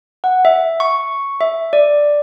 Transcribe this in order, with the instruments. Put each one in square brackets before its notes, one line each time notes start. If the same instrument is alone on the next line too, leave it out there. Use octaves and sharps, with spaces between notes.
[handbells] F#5
E5
C#6
E5
D5